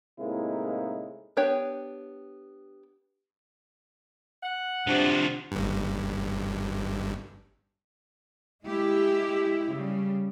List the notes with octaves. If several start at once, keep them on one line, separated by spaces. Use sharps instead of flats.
A2 C3 G#3 A#3 D#4 E4
B3 D4 G4 C#5 G5
F#5
C3 F3 D4 F#4
G1 G2
G#3 E4 G4
C#3 G3